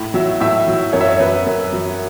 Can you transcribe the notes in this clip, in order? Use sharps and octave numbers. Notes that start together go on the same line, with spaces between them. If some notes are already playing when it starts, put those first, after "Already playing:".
Already playing: A2
F#3 E5
A2 E5
F#3
F#2 C#5
E5
C#5
F#3 B4
F#2
F#3